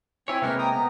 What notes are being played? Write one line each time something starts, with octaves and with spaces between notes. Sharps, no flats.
C4 E4 C#5 G#5
C3 G#3 A#3 B4 F6
G5 A#5 D#6
B3 A#5